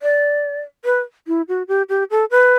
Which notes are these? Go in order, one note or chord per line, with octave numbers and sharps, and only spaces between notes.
D5
B4
E4
F#4
G4
G4
A4
B4